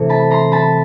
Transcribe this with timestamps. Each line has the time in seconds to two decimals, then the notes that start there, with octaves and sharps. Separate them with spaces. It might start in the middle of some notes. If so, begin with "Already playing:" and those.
Already playing: C3 E3 A3 C4
0.09 A5 B5
0.31 A#5 C6
0.52 A5 B5